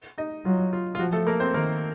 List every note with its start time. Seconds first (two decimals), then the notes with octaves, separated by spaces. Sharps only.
0.18 D#4 D#5
0.45 F#3 F4
0.73 F4
0.95 F4
0.99 F3 F#4
1.13 A3 A4
1.27 A#3 A#4
1.40 C4 C5
1.54 D#3 A#3 A#4